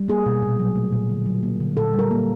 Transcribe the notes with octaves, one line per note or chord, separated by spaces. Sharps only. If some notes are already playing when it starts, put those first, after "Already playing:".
Already playing: G3
A#3 G#4
B2
A#2
F#3
A3
A#2
D3
F#3
A#3
D3
A#2 A4
G3
A#4
A#3